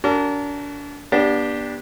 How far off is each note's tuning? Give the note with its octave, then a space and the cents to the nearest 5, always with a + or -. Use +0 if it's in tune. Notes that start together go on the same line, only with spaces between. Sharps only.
D4 -35 F#4 +25 A#4 -30
B3 -35 D4 +0 G4 +0